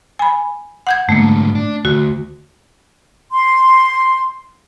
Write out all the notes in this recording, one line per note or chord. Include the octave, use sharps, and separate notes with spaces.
G#5 B5
F#5 G6 G#6
G#2 D3 A3 A#3
D4
D2 F#4
C6